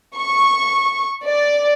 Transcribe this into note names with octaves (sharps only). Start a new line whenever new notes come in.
C#6
D5